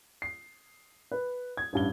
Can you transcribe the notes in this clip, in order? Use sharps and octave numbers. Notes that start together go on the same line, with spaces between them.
C7
B4
G#6
A1 G2 G7